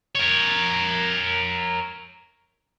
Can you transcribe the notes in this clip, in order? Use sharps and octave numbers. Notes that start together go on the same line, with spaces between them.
A#4 C#5